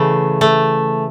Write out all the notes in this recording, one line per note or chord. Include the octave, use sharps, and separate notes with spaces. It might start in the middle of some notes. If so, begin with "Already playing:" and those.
Already playing: C#3 E3 A3
A3